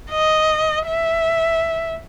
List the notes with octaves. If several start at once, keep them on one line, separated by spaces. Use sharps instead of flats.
D#5
E5